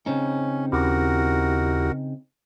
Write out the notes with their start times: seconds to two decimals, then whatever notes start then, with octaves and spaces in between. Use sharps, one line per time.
0.06 C#3 C4 C#4 D#4
0.72 D#2 E4 F#4 G4 A#4